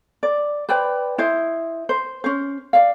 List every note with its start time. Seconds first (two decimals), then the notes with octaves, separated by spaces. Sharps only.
0.23 D5
0.69 B4 C5 D5 G5
1.18 E4 C5 D#5
1.89 C5
2.24 C#4 C5
2.73 D5 F5